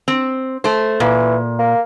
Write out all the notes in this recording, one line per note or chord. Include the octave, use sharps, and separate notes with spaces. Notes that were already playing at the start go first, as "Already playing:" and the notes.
C4
A3 C5
A#2 E3
A#3